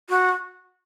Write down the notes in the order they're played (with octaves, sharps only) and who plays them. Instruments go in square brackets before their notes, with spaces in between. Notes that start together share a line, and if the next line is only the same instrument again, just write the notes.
[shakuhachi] F#4